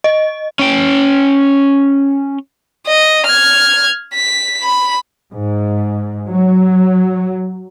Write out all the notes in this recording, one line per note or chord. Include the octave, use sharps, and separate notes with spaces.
D#5
C#4 G5
D#5
F6 G#6
B6
B5
G#2
F#3